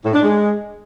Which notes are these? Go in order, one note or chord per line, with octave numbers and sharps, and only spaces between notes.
A2
D4
G#3